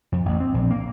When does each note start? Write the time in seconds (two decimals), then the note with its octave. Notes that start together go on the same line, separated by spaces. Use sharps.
0.12 F2
0.26 A1
0.40 C4
0.54 A#1
0.71 A#3